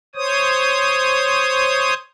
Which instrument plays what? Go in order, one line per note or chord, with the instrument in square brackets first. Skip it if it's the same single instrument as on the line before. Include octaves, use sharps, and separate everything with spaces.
[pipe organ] C5 C#5 D#6